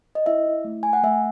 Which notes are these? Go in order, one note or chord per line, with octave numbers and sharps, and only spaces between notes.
D#5
E4 E5
E4
A3
A3 G#5
F#5
A3 E5